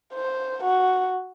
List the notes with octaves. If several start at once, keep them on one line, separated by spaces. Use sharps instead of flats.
C5
F#4